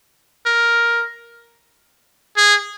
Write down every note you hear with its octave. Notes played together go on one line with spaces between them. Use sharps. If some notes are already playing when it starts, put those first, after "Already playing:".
A#4
G#4